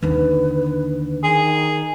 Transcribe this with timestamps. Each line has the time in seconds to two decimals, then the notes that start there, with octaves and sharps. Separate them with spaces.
0.03 D#2 D3 B4
1.23 D#3 G#4